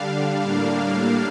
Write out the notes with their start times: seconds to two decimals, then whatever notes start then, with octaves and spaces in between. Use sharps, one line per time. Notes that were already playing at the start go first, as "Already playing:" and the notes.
Already playing: D3 G3 D4 F5
0.40 A2 G3 A#3 D4 F5